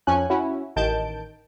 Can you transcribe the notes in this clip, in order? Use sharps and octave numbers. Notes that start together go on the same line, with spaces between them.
F2 C#4 G#5 F#6
C#4 E4 F#4
A1 D#3 A5 G6 D7